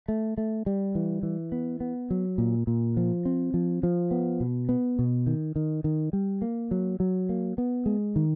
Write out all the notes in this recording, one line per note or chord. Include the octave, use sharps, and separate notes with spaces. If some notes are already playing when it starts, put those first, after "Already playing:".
A3
A3
G3
E3
E3
B3
B3
F#3
A#2
A#2
F3
C4
F3
F3
B3
B2
B3
B2
D#3
D#3
D#3
G3
A#3
F#3
F#3
A#3
B3
G#3
D#3